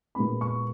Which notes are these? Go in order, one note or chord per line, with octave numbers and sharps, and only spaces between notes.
A#2 G#3 B3 B5
C#6